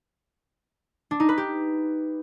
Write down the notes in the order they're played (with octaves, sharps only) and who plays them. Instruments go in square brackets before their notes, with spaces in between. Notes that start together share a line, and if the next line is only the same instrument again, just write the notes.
[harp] D4
D#4
B4
G4